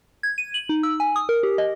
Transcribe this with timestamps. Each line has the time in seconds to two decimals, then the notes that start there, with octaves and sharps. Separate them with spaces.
0.23 G#6
0.38 D#7
0.54 F#7
0.69 D#4
0.83 E6
1.00 G#5
1.16 D#6
1.29 A#4
1.43 G4
1.58 D#5